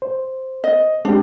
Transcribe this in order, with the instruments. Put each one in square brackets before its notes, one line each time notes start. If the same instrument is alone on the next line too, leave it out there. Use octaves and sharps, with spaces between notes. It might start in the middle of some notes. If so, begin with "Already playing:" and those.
[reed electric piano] C5
[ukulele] D#5
[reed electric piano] G#3 C4 G4 [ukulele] D4